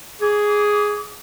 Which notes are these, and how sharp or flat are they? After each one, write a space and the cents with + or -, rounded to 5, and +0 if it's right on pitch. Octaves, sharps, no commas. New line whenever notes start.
G#4 +0 D6 -30